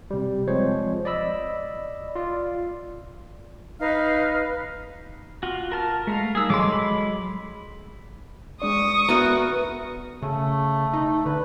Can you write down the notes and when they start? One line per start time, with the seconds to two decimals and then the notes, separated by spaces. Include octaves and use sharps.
0.11 C3 G3
0.47 F3 G#3 C4 C5 C#5
1.05 D5 D#5 B5 E6
2.15 F4 D5
3.80 D#4 B4 F5 F6
5.43 F4 F#4
5.72 A#4 A5 F6
6.07 G#3 A3 A#4 F5 A#5
6.35 G3 G#3 D#4 G#4 E6
6.50 F#3 G#3 G#4 A4 C6 D6
6.72 B5
8.62 G#3 D4 D5 C#6 D#6
9.09 B3 F#4 A#4 E5 A#5
10.22 C#3 A3
10.94 D#4
11.26 D3 B4